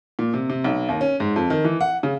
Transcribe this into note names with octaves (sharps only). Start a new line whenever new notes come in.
A#2
C3
C3
B1
D#2
C#4
G#2
F2
D#3
E3
F#5
C#3